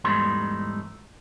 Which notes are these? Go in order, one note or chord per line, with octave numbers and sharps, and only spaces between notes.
E2 G#2 G3 A3 D#4 C6